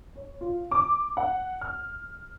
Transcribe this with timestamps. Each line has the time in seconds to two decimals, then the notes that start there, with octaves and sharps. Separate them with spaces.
0.16 C#5
0.41 F4
0.71 D6
1.17 F#5
1.61 F6